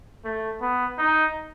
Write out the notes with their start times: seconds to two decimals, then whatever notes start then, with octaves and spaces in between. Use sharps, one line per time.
0.24 A3
0.61 B3
0.98 D#4